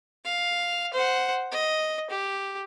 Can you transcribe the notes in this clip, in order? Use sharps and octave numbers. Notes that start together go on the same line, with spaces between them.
F5
C5 F#5
D#5
G4